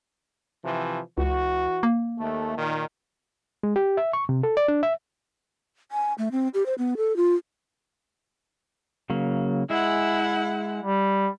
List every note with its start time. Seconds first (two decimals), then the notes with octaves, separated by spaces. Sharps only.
0.64 C3 E3 F3
1.18 C#2 E3 F#4
1.83 A#3
2.18 D#2 A3
2.57 A#2 D#3
3.63 G#3
3.76 G4
3.97 E5
4.13 C#6
4.29 C3
4.43 A4
4.57 D5
4.68 D4
4.83 E5
5.92 G#5
6.18 A3
6.32 C4
6.54 G4
6.66 C5
6.78 B3
6.97 A4
7.17 F4
9.10 C#3 F#3 A#3
9.70 G#3 E4 G#4 E5 F#5
10.82 G3